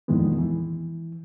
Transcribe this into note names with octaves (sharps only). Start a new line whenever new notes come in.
F2 A#2 D#3 E3 G#3 B3
E3